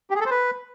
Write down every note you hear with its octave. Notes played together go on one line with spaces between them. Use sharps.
G4
G#4
A4
C5
B4